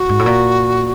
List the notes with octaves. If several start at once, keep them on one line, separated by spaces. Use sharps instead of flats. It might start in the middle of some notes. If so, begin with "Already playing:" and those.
Already playing: F#4
G#2
A2
A#2